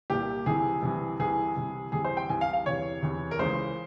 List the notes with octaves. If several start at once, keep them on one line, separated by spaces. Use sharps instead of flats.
C2 A#2 G4
C2 C3 E3 G#4
C2 C3 E3
C2 C3 E3 G#4
C2 C3 E3
C2 C3 E3 G#4
C5
G5
C2 C3 E3 G#5
F5
F5
E2 C3 E3 C#5
E2 C3 E3
A#4
C#2 C#3 E3 C5